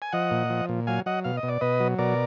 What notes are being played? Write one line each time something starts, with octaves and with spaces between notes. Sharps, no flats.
G#5
F3 D#5 F#5
A#2
F3
A#2
F#3 F5 G#5
F#3 D#5 F#5
B2 F5
D#5
B2
D5
B2 B4 D#5
F#3
B2 A#4 D5